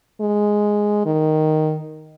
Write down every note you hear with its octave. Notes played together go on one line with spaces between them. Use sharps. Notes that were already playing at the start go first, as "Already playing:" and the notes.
G#3
D#3